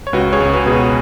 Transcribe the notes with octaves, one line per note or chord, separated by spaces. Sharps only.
C#5
C#2 F#4 B4
G#4 C#5
C#2
F#4 B4
B2 G#4
F#4 B4